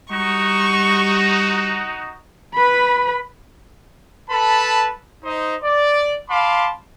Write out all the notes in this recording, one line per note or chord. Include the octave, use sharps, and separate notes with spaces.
G3 D#4 F#4 C#6
B4 B5
A4 B4 A5 B5
D#4 C5 D#5
D5
F5 A5 B5 C6 D6